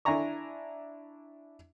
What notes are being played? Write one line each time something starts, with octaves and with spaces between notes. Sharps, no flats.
D4 E4 G#5 A#5 C#6